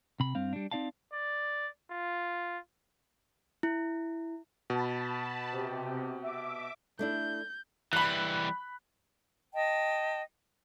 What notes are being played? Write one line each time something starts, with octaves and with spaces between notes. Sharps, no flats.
C3 B5
G2 C4 F5
G3 D4
C4 D#4 D5 F5 A5
D5
F4
E4
B2 A5 B5
C3 G4
E5 D6
A3 D4 E4 G6
E3 G3 B5 F#6
D#5 G5 A5